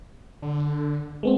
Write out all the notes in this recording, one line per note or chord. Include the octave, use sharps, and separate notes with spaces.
D3
G#3 B3 C4